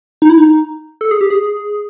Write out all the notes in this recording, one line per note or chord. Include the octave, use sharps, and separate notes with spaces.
D#4
E4
D#4
A4
G#4
G4
G#4